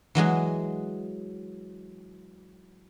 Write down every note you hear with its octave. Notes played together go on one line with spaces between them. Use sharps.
E3 F#3 G#3 G#4